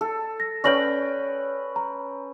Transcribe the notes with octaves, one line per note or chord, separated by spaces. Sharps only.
A4
A#6
C#4 B4 D5 G5 A#6 F#7
A#5